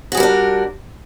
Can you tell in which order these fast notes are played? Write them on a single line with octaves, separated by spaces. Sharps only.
F#4 G#4 G3 A#4 D4